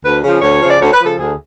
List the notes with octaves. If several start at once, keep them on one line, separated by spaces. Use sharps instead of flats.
D2 B4
C#3 F3
D2 C#5
C#3 F3
D5
D2 C#5
B4
F3
C#3 A4
D2 G#4